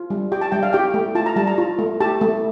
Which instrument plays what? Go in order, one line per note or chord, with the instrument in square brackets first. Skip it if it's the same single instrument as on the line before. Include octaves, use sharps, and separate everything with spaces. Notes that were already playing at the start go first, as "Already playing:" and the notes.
Already playing: [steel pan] F4
G3
G4 G5
A5
G3 G5
F5
G4 G5
A3
F4 A5
A#5
G3 A5
A#5
F4
A3
G4 A5
A3